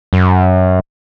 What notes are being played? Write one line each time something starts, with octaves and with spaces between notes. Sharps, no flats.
F#2